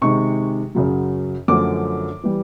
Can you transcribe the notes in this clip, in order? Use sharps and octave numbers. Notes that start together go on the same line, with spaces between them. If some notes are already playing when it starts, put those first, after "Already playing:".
C3 D#3 G#3 C#6
F#2 C#3 F#3
F#2 D3 F3 A3 D6
E3 G3